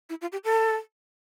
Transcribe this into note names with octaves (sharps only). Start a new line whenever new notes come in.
E4
F4
G4
A4